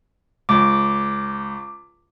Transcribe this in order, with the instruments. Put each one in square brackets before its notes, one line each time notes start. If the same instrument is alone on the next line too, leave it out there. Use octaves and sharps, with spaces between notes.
[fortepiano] C#2 [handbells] D6